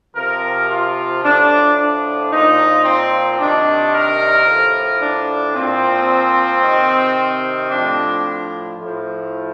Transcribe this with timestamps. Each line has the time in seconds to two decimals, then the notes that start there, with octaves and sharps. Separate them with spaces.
0.14 C3 F3 A#4
0.69 F4
1.22 A2 F3 D4
1.77 D4
2.30 A#2 F3 D#4
2.85 C4
3.38 C3 D#3 D4
3.93 A#4
4.46 A2 F3
5.01 D4
5.55 A#2 F3 C4
6.63 C3 D#3
7.70 A2 F3 D4
8.79 A2 F3